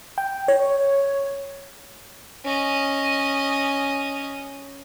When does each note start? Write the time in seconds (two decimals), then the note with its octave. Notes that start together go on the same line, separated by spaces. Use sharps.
0.18 G5
0.48 C#5
2.45 C#4 D#5